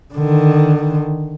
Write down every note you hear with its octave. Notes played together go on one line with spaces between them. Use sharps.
D3 D#3